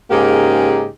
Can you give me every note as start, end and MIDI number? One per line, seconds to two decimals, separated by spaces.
0.11 0.88 44
0.11 0.88 49
0.11 0.88 58
0.11 0.88 63
0.11 0.88 67
0.11 0.88 68